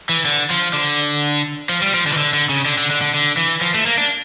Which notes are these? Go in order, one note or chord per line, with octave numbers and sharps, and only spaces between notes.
E3
D3
F3
D3
F3
G3
F3
D3
E3
D3
D3
C#3
D3
D3
D3
D3
D3
E3
F3
A3
A#3
D4